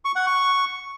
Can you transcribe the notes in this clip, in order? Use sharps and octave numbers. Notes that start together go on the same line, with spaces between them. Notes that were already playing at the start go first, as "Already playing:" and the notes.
C#6
F#5
C#6